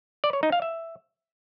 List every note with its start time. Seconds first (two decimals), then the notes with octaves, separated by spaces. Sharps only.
0.24 D5
0.33 C#5
0.43 D#4
0.52 F5
0.62 E5